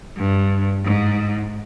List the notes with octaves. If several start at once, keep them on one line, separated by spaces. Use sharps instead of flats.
G2
G#2